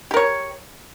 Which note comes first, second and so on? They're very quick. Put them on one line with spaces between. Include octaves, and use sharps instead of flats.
G4 A#4 C#5